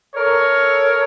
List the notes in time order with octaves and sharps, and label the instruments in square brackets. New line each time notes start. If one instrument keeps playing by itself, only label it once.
[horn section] A4 A#4 C#5